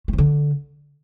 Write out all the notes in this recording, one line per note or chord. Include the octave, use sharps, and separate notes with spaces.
A3
F3
D3